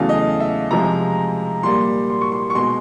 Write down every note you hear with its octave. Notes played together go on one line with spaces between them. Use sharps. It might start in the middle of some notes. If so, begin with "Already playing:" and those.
Already playing: E2 C#3 F#3 A3 F5
D#5
E5
C3 F3 G#3 A#5
A#2 G3 A#3 C6
C6
C#6
C6
C#6
B2 G#3 C6